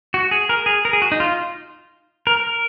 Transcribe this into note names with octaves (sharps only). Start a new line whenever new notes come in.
F#4
G#4
A#4
G#4
A#4
G#4
F#4
D#4
F4
A#4